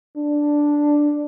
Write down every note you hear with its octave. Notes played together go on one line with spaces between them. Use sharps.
D4